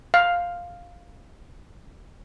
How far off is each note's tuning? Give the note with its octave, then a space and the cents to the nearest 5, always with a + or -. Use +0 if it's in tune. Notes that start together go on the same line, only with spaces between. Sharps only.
F5 +5